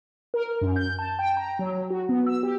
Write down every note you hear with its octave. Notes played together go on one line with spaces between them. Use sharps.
A#4
F#2
G6
A5
G5
A#5
F#3
F#4
B3
E6
G4